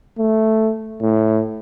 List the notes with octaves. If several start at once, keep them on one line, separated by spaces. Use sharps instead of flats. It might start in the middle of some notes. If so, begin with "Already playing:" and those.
A3
A2